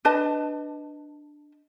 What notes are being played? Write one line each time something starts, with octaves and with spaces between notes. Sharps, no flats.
D4 B4 D#5 A5